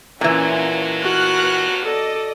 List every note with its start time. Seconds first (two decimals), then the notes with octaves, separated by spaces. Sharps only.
0.21 D#2 A#2 D3 E3 F#3 C#4 F4
1.02 B3 F#4 F6 F#6
1.84 A4 D5 D#5